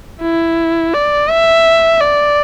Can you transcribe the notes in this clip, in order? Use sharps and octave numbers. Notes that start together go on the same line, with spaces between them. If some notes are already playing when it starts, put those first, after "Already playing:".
E4
D5
E5
D5